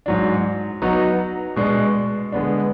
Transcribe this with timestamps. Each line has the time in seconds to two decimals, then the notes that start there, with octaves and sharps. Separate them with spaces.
0.06 G#2 F#3 D4
0.82 F#3 B3 D#4 F#4
1.56 B2 G#3 D4
2.32 D3 G#3 B3 D4